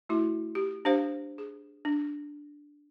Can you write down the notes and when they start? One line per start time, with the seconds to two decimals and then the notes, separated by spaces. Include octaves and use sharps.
0.09 A3 E4 F#4
0.55 G4
0.85 D4 G4 C5 F5
1.38 G#4
1.85 D4